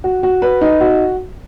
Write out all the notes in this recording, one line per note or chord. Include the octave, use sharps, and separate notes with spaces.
F#4
F#4
B4
D#4
F#4